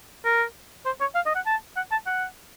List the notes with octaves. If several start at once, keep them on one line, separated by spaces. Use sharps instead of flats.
A#4
C5
C#5
F5
D#5
F#5
A5
F#5
A5
F#5